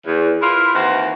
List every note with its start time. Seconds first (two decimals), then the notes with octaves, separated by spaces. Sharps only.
0.06 E2
0.42 E4 F4 A#4 B4
0.74 D#2 E3 C4 F#4